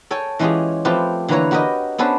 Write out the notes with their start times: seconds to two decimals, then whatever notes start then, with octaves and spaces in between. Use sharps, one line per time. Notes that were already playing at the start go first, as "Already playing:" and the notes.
0.11 A4 C#5 G5 G#5
0.39 E3 G#3 C#4 F4 G4 G#4
0.85 F3 A3 C4 F4 G4 B4
1.28 D3 E3 A#3 B4 C#5 A#5
1.51 F#4 G4 A#4 B4 D#5
1.98 B3 C#4 D4 A4 B4 C5